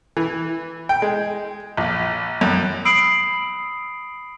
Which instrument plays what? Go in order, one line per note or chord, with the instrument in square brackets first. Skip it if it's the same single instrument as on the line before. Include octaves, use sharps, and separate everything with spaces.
[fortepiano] E3
G5
G#3
A#1
F#2
[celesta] B5 D#6 E6 C7 D7 F#7